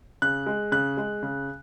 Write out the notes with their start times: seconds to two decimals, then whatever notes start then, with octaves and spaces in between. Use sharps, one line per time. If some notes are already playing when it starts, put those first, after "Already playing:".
0.22 C#3 F#6
0.46 G#3
0.72 C#3 F#6
0.97 G#3
1.23 C#3